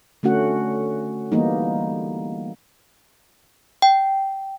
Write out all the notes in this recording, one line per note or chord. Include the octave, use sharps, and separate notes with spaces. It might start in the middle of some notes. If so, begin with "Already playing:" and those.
D3 A3 C#4 F#4 F#5
E3 G3 A#3 B3 D#4
G5